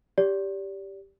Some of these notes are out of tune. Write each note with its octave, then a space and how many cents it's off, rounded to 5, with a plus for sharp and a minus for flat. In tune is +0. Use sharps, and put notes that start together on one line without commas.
G4 +0 D5 -30